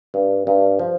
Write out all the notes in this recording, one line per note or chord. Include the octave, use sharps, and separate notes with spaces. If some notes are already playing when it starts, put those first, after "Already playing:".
G2
G2
F3